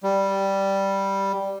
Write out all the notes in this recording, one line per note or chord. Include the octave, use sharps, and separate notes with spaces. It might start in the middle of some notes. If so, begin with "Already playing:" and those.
G3